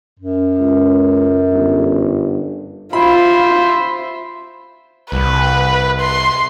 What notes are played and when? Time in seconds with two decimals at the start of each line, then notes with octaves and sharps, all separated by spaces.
0.20 F#2
0.58 C#2
1.51 G1
2.93 F4 C5 E5 B5
5.12 C2 B4
6.01 C6